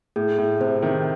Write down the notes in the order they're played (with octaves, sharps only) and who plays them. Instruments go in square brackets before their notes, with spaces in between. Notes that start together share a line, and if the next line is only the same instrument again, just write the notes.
[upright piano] A2 [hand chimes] G#4
[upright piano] A2
[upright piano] C3 [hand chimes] C5
[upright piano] C3 D#3